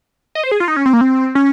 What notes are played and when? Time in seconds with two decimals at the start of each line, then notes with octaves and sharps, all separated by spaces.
0.35 D#5
0.43 C5
0.51 G#4
0.60 F4
0.68 D#4
0.76 C#4
0.86 C4
0.93 A#3
1.01 C4
1.35 C#4